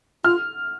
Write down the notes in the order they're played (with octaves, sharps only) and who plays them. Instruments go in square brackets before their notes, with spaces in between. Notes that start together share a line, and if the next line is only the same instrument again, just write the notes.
[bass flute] F4 [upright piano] F6